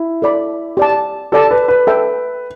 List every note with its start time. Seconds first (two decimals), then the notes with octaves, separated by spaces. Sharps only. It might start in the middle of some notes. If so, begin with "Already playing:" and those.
Already playing: E4
0.22 A4 D5 B5
0.77 G4 D5 A5
1.32 G4 A4 D5 A5
1.51 B4
1.68 B4
1.87 A4 E5 G5